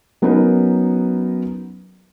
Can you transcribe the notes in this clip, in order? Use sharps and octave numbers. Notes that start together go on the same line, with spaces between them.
F#3 B3 C#4 D#4 A#4 B4